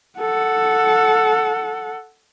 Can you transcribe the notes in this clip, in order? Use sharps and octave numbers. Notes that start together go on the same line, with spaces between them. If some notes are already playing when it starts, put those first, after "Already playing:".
A4 F#5